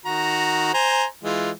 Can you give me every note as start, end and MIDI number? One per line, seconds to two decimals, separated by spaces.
0.06 0.73 51
0.06 0.73 66
0.06 0.73 82
0.74 1.05 72
0.74 1.05 80
0.74 1.05 82
1.24 1.51 52
1.24 1.51 56
1.24 1.51 65